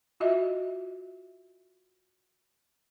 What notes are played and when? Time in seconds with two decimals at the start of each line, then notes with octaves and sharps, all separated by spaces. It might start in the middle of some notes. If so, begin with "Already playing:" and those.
0.20 F4 F#4 D#5 E5